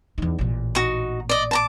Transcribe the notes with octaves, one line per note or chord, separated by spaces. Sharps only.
E2 D#4
A1 A#2
D#4 F#4
D5 D#5
A5 A#5 D6